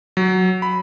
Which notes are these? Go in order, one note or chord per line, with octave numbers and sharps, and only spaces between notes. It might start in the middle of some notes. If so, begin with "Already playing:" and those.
F#3
B5